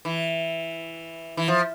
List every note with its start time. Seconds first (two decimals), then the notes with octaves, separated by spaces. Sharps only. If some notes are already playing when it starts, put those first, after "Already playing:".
0.05 E3
1.37 E3
1.48 F3